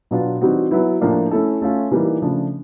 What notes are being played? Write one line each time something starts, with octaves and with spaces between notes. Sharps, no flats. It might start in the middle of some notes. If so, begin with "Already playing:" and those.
B2 F#3 B3 D4 F4
E3 G3 C4 D#4 F#4
F#3 B3 E4
A2 F3 A#3 D4
A3 C#4 E4 A4
A3 C#4 F4
E3 G3 A#3 D#4
C#3 F3 A3 D4